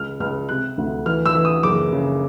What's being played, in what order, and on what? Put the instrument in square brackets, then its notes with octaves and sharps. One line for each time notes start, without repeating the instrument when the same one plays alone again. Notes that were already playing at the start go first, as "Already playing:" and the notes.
Already playing: [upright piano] C#2 F6
C#2 F6
C3 F#6
D2
E3 F6
E6
E3
D#6
F#1 D6
C#3